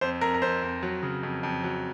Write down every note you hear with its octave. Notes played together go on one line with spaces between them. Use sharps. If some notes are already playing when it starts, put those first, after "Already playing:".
F2 C5
F2 A#4
A#4
F2 C5
F2
F#3
C#3
F2
F2
F#3